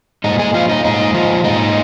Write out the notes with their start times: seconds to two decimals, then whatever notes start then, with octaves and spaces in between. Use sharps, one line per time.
0.24 A#2 G#3 D#4
0.39 G#3 G#4
0.54 F3 F4
0.69 D#4
0.84 A#2 G#3 D#4
1.14 F3 F4
1.44 A#2 G#3 D#4